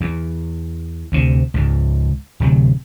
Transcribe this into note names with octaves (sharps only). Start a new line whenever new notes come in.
E2
D2 C3
C#2 G#2
D1 C3 F#3